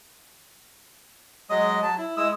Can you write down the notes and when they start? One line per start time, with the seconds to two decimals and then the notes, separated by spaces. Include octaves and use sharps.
1.50 F#3 G#3 D#5 D#6
1.82 F#3 A5
1.98 E4
2.17 G#3 E4 D#6 E6